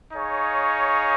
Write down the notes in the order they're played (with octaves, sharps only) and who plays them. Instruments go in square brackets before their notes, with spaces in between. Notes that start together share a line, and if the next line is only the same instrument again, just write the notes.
[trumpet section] D#4 G#4 C#5 F5